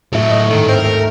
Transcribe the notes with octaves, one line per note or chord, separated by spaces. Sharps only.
A2 F#3 A3 E5
D#5 C#6
D#1 G#2 D#3 A3 D#7
C4 A#4 D#5
A3